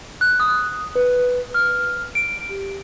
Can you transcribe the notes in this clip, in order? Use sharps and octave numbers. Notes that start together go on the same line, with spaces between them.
F#6
D#6
B4
F6
D7
G4